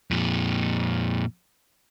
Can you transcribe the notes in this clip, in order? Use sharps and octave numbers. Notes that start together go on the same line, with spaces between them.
F2 A#2